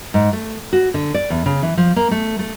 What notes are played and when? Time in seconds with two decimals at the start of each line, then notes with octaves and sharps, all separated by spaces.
0.14 G#2
0.33 A3
0.73 F#4
0.94 D3
1.14 D5
1.30 E2
1.46 C#3
1.63 E3
1.77 F3
1.96 A#3
2.11 A3
2.39 A3